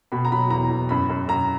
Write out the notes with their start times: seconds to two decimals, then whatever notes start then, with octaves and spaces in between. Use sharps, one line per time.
0.12 B2 B5
0.25 A#5
0.32 F#3 B5
0.50 E2 A#5
0.71 E2
0.89 F#2 B5
1.09 F#2
1.28 F#2 A#5